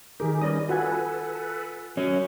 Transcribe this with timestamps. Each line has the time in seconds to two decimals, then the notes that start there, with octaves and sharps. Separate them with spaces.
0.20 D#3 D#4 G4 G#4 A#4
0.42 G3 C#4 B4 D5 D#5 D#6
0.69 F4 F#4 A4 B4 F#5 G#5
1.97 F#3 C#4